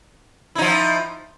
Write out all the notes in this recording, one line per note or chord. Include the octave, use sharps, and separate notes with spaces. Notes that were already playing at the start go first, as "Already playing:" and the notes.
F3 D#4 E4